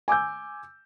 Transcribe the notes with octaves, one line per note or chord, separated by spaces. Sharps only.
G#5 D6 E6 G6